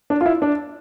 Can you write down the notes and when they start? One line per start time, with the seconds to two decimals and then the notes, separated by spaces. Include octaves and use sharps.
0.10 D4
0.21 F4
0.26 E4
0.42 D4